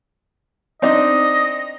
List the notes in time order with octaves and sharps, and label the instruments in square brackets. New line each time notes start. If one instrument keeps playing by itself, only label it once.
[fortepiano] C4 D4 D#4 [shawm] D#5